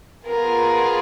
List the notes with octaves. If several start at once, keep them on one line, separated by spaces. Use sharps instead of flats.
B3 F4 G#4 A#4